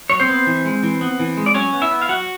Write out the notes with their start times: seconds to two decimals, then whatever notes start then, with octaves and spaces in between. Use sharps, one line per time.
0.10 F#3 C#5
0.20 C4 C5
0.29 B3
0.47 E3
0.65 G#3
0.83 E3
1.01 B3
1.20 E3
1.37 G#3
1.46 D5
1.55 F#3 C#4 C#5
1.73 B3
1.82 E4 E5
1.91 B3
2.02 F5
2.09 F#3 F#4 F#5